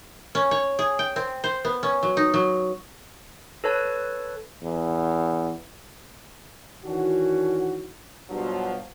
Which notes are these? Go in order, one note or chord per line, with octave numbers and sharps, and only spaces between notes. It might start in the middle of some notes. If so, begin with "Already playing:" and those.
C#4
C#5
G#4
G5
C4
C5
B3
C#4
F#3
D#4
F#3
A4 B4 C#5 A5
E2
D#3 E3 C#4 D4 F#4
G2 B2 F3 F#3